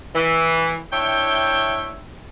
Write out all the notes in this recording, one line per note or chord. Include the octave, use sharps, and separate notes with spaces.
E3
D4 E4 C#5 E5 G5